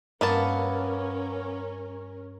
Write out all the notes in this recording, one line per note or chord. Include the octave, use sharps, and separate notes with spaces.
G2 A#3 B3 C#4 A#4 E5 A5 C#7